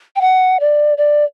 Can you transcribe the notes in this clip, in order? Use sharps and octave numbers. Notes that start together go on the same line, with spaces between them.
G5
F#5
D5
D5